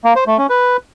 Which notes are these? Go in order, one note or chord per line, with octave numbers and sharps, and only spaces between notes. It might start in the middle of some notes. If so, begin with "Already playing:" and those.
A#3
C5
A3
C#4
B4